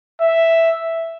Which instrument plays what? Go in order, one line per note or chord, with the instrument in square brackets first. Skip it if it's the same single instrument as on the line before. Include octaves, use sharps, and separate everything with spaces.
[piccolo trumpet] E5